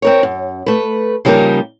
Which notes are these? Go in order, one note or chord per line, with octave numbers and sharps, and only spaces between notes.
C4 A#4 C#5
F#2
A3 B4
C#3 F3 G3 A#3 D#4 A#4